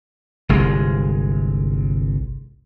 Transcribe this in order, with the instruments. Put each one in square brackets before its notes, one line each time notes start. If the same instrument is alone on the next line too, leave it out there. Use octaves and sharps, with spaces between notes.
[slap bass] G1 C2 G#3